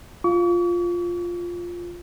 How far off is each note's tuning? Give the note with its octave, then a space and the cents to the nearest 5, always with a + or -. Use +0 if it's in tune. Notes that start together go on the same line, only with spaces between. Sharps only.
F4 +0 C#6 +45